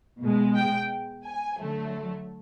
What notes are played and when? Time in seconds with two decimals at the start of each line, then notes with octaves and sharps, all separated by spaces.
0.21 B2 G#3
0.55 G5
1.25 G#5
1.59 D3 F#3 A3